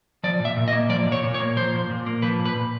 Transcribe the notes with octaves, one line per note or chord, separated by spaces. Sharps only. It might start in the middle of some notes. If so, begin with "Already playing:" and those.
F3 D5
A#2
E5
A#2
D#5
A#3
F3 D5
A#2
C#5
A#2
C#5
A#3
F3 C5
A#2
A#2
A#3
F3 B4
A#2
B4
A#2